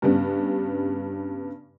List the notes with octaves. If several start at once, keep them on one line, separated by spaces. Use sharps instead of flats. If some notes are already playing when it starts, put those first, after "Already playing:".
G2 C#3 G3 B3